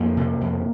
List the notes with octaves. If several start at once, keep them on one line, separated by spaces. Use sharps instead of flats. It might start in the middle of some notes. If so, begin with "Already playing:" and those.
Already playing: F2 A#3
C3
F2